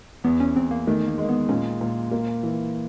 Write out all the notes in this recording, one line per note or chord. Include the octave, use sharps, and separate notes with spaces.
E2 B3
C#4
E2 C4
A#3
D#3 A3
A#3
G#3
A#3
B3
A#2 C#4
A#2
A#3
E3